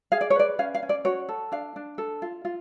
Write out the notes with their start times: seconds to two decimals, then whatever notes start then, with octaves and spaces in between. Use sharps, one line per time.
0.12 G#4 F5
0.21 D5
0.30 C#5
0.35 B4 D5
0.59 C#4 F5
0.74 F5
0.83 C#4
0.89 D5
1.05 F#4 C#5
1.29 A4
1.52 D4 F5
1.76 D4
1.98 A4
2.22 F4
2.45 F4